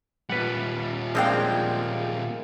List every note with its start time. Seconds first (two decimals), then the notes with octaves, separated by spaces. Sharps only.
0.30 A#2 G3 B4 F#5
1.15 F3 G#3 A#3 C4 D4 G5